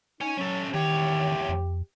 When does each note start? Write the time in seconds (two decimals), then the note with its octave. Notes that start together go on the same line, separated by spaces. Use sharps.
0.21 D#4 C#5 G#5
0.37 F#3 C#4 A4
0.74 E2 D#3 G4 C#5
1.49 F2